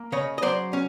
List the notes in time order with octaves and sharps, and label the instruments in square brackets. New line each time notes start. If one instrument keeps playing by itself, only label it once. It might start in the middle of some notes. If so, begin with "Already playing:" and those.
Already playing: [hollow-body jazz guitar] A#3
C#3 C#5 D#5
D#5
F#3 C5 D5
C#4